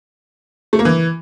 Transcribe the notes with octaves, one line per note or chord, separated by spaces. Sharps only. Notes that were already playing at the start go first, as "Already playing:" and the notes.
A3
A#3
E3